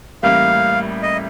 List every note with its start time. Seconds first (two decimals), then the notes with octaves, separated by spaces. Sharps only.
0.23 A1 A2 G3 A#3 F5
1.03 D#5